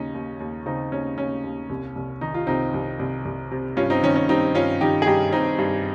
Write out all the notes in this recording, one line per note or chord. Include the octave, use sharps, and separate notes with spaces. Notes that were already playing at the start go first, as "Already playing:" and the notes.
Already playing: D#2 C#3 C#4 D#4
D#2
D#2
C#3 C4 D#4
D#2 C#4
D#2 C#4
D#2
C2
C2
D#3 D#4
F4
C2 C4 D#4
C2
C2
C2
C3
G2 C#4 F4
C4 D#4
D#3 C#4
C#4
G2 C4 D#4
G2 C#4 F4
D#3 D#4 G4
G#4
G2 D#4 G4
G2 C4 D#4
G2